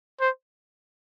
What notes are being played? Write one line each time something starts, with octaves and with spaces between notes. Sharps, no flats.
C5